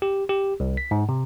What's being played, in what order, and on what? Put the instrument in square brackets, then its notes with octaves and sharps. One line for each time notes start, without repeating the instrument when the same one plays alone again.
[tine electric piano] G4
G4
C2
B6
G#2
C3